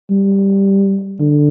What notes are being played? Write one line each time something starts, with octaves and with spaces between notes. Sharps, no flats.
G3
D3